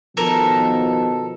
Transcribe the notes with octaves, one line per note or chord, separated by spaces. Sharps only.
B2 D#3 F3 A4 A#4